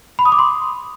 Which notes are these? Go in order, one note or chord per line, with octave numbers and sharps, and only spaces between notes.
B5
D#6
D6
C6